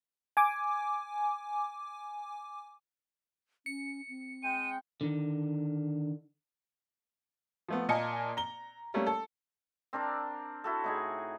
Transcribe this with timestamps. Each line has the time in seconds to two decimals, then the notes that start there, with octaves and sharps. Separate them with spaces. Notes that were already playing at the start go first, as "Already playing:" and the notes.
0.37 G#5 D6
3.66 C#4 C#7
4.09 C4
4.43 G#3 G5 D#7
5.01 D3 D#3
7.69 F3 A3 B3
7.89 A#2 A#3 D#5 G#5 A5 C#7
8.37 A#5 G7
8.94 G3 A3 A#3 C#4
9.07 A4
9.93 C4 D4 A#4 D5
10.64 E4 F#4 A4
10.84 A2 D#4 G#4